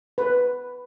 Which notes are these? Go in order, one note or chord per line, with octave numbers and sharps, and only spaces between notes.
B4